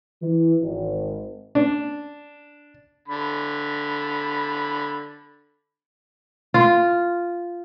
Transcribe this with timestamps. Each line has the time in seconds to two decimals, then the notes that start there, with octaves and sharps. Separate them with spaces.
0.22 E3
0.62 G#1
1.55 D4
3.08 D3 B5
6.54 F4